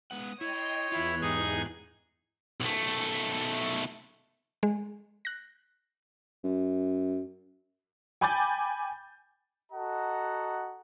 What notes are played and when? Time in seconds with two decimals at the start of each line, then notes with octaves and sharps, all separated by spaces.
0.11 G#3 B3 F#5 D#6
0.41 E4 C#5 D#5 G5 C6
0.92 E2 E3 E4 F4 F#6
1.22 G#2 D#4 G4 G#4 G#6
2.61 B1 A3
4.63 G#3
5.25 F#6 A#6
6.44 F#2
8.21 G5 G#5 B5 D6 G6 A6
9.72 F#4 A4 D#5 F#5 A#5